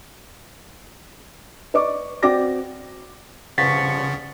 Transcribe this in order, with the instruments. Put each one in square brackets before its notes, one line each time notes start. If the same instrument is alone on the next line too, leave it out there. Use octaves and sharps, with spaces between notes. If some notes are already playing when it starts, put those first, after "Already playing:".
[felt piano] B4 D5 D#5 C#6 D6
C4 F#4 D5 G5 D6 A#6
[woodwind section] G2 F3 C#6 [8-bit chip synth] C#3 [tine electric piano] F#5 A6 B6